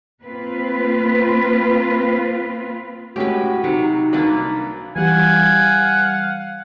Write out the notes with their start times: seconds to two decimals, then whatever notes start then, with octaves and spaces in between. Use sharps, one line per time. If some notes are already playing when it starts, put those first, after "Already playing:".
0.24 A#3 C4 F4 B4
3.16 A2 G#3 C#4 F#4 G4 B4
3.64 C3 F#3 D#4
4.13 C2 A#3 D4 B4
4.96 E3 G3 F5 F#5 G#5